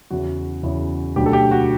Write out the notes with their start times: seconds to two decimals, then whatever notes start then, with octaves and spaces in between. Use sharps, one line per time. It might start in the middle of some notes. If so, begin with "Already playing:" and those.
0.10 E2 C#3 E3 F#4
0.63 E2 C#3 E3
1.16 E1 D2 D3 F#3 G4
1.26 A4
1.33 G4
1.51 F#4